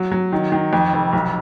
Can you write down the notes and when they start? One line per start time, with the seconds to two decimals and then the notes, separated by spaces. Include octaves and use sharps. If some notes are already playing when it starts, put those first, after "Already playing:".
Already playing: F#3
0.11 F#3
0.32 D#3
0.52 D#3
0.73 F2
0.93 F1
1.13 B1